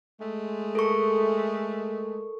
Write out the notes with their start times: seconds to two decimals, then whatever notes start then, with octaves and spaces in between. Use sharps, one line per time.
0.20 G#3 A3
0.75 A4 A#4 C#6